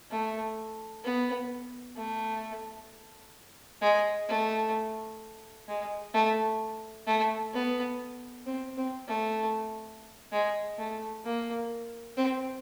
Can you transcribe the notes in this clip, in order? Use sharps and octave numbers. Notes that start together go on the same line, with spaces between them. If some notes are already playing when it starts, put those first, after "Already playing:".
A3
B3
A3
G#3
A3
G#3
A3
A3
B3
C4
C4
A3
G#3
A3
A#3
C4